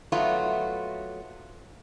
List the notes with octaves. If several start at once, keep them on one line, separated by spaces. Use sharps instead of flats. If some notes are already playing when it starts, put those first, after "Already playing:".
F#3 A3 B3 F4 F#4